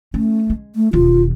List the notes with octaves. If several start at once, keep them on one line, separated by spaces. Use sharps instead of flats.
A3 C#4
G#3
A3
E1 D#2 F4